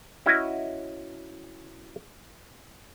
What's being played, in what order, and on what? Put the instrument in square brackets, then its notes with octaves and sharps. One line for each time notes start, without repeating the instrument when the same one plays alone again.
[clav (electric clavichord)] C#4 E4 F#4 D#5